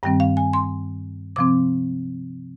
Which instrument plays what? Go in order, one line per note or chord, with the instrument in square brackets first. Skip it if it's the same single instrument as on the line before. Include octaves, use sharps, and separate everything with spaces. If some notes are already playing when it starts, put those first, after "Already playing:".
[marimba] G2 D#3 G3 C4 G5
F5
G#5
C6
C3 F3 C4 D6